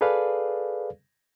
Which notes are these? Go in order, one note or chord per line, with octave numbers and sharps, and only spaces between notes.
G#4 A4 B4 D5 F5